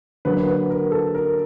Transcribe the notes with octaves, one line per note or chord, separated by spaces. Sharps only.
D3 F#3 A#3 B4
B4
A#4
A4
A#4